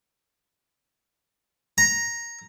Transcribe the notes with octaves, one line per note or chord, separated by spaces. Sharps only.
A#5